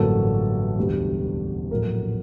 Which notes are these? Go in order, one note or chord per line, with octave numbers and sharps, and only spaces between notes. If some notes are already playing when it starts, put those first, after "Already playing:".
Already playing: A1 G2 D3 F#3 A#3 A4
E1 D2 D3 G3
A#1 A2 F#3 A3 A#4